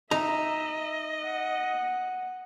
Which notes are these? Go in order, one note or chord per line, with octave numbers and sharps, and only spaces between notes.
D#4 D#5 E5 A#5
F#5